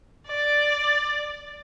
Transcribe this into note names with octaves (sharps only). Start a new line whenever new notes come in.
D5